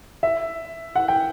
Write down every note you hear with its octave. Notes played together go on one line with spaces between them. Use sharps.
E5
F#5
G5